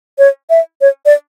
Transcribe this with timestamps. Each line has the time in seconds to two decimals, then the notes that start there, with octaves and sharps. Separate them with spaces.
0.18 C#5
0.50 E5
0.81 C#5
1.06 D5